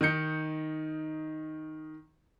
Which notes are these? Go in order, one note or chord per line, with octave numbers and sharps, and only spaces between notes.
D#3 D#4 G6 C#7